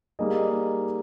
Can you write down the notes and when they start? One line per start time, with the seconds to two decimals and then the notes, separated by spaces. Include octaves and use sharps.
0.19 G3 A#3 D#4 G#4 D#5